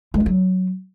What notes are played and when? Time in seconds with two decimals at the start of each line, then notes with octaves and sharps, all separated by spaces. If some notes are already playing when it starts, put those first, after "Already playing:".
0.14 G#3
0.20 D4
0.26 F#3